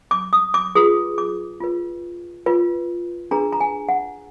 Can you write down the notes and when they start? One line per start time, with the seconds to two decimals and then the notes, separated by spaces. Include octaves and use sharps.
0.11 D6
0.33 D#6
0.54 D6
0.75 F4 G#4 B4 D#6
1.18 D6
1.60 F4 B4
2.46 F4 B4
3.31 D4 G#4 B4 A#5
3.53 A#5
3.60 G#5
3.89 F#5